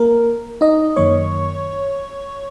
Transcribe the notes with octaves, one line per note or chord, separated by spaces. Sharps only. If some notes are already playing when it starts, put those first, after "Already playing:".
Already playing: A#3 A#4
D#4 D#5
F#2 D#3 A#3 C#5 C#6